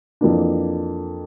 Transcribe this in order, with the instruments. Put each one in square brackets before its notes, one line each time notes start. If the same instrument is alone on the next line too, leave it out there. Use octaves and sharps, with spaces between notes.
[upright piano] F2 E3 A#3 D4